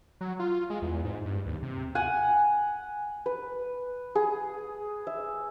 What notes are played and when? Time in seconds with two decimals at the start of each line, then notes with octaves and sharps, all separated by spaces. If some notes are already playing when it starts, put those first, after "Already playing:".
0.21 F#3
0.39 F4
0.70 G#3
0.82 E2
1.04 G#2
1.25 G2
1.46 D#2
1.63 C3
1.95 F#5 G#5
3.26 B4
4.15 G#4
5.07 E5